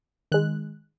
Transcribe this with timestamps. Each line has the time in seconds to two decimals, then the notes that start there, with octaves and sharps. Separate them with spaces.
0.32 D#3 G#3 F#6